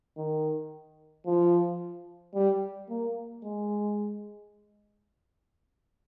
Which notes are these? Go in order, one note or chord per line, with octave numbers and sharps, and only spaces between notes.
D#3
F3
G3
A#3
G#3